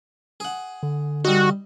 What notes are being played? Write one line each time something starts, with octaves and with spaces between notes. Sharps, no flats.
G#4 F#5
D3
G3 D#4 F#4